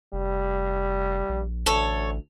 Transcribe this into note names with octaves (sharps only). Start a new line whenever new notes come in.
F1 G3
A#1
A1 D2 A4 C#5